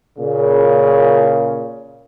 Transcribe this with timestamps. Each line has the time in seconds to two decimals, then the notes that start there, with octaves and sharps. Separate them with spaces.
0.19 A#2 C#3